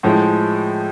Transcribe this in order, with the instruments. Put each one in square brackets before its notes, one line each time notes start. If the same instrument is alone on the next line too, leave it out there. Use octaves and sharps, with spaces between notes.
[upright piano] A2 F3 G#3